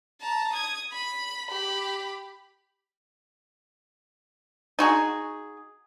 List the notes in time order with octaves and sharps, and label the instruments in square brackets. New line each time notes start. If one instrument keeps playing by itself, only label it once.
[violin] A5 A#5
D#6 G#6
B5
G4 B5
[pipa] D#4 F#4 G#4